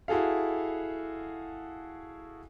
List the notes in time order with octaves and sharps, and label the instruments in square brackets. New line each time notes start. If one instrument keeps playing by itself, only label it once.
[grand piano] E4 F#4 G#4 A4 F5